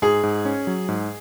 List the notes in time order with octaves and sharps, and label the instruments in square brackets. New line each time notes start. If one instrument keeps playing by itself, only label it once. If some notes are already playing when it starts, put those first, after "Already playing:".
[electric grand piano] G#2 [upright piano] G#4
[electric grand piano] G#2
C#4
F#3
G#2